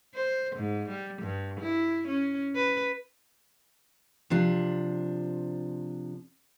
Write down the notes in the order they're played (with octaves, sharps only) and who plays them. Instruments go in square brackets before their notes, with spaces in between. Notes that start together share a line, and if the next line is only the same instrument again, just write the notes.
[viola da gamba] C5
G#2
G3
G2
E4
C#4
B4
[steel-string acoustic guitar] C3 F3 D4